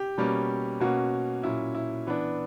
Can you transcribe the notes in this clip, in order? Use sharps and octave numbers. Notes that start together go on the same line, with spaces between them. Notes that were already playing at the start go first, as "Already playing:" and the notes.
Already playing: G4
B2 G3 A#3 C#4
B2 A#3 C#4 F#4
A#2 F#3 C#4 E4
E4
E3 B3 D4